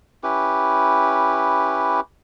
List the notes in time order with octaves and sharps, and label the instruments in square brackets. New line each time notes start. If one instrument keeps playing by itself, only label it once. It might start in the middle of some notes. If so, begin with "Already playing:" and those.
[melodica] C#4 E4 G4 B4